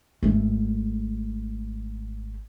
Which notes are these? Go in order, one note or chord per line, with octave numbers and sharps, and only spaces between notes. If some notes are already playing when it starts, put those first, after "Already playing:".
G#1 A3